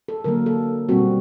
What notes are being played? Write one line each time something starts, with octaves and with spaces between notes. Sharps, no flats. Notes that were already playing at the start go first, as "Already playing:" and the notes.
A4
D3 F#3 A#3 A#4
A4
B2 G3 C4 F#4